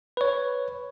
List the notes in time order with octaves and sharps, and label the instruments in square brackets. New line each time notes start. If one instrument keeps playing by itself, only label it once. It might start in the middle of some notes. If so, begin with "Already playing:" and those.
[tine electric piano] B4 C#5